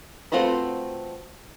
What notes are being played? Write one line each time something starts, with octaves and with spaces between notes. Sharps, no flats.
A3 C4 F4 F#4 B4